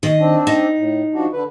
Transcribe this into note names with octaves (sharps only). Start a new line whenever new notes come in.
D#3 D#5
C4 D4
D#4
A2
F3 D4 F#4
D3 B4